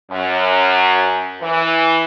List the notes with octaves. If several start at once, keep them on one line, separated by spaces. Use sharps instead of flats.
F#2
E3